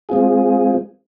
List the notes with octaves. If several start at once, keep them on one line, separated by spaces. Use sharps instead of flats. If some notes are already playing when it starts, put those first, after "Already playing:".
G#3 C4 F4 G#4